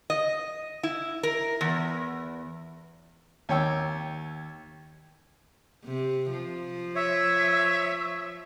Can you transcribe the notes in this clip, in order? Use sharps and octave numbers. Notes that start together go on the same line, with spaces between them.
D#5
E4
A#4
E2
D#2 C#5 G5 E6
C3
F3
C#5 E5